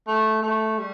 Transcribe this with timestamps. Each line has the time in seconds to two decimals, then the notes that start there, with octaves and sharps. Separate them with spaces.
0.07 A3
0.42 A3
0.79 G3